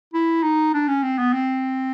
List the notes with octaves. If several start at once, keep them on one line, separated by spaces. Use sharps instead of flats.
E4
D#4
D4
C#4
C4
B3
C4